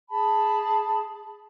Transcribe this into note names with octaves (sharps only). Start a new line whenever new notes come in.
G#4 A5 B5